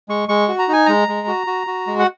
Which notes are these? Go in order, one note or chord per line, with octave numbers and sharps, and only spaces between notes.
G#3 C#6
G#3 C#6
F#4
A#5
D#4 G#5
G#3 A#5
G#3
F#4
F#4
F#4
G#3
F#5